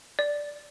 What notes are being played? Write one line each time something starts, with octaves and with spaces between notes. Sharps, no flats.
D5